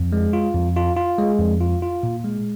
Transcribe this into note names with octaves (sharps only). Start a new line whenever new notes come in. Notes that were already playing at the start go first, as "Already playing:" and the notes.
Already playing: F2
G#3
F4
F2
F4
F4
G#3
F2
F4
F4
A#2
G#3